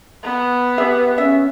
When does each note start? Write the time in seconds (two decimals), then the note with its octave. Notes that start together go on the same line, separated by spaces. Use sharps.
0.23 B3
0.78 G4 G#4 B4 E5
1.18 C#4 E5